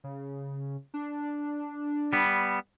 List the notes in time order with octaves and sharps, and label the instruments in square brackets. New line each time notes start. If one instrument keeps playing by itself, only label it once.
[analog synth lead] C#3
D4
[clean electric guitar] G3 B3